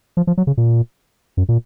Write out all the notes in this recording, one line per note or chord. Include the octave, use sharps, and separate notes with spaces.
F3
F3
F#3
C#3
A#2
F#2
A#2